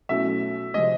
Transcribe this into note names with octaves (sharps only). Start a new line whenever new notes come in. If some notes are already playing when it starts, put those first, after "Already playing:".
B2 F#3 A3 C#4 E4 E5
C3 F3 G#3 D#5